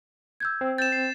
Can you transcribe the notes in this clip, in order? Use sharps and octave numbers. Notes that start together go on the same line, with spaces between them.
E6 G6 G#6
C4
G6 A6 E7
C7